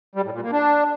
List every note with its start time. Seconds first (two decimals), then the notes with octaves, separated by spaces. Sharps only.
0.15 G3
0.24 A2
0.34 A#2
0.43 A#3
0.52 D4